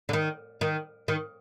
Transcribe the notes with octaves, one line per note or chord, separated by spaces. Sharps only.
D3
D#3
D#3
D#3